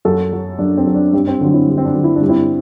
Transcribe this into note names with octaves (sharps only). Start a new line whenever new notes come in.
F#2 F#4 A4
F#3
F#2 D4
C4
F#3
D4
G2 C4
C4
D3 F#3
C4 E4
G2
C4
D4
D3 F#3
E4
D4
G2
C4 E4